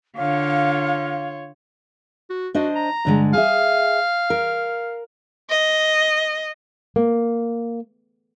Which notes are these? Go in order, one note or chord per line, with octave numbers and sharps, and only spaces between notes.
D3 F4 C#5 F5
F#4
D4 F#4 C5 D#5
A#5
G2 D3 G#3
G#4 E5 F5
A#4
D#5
A#3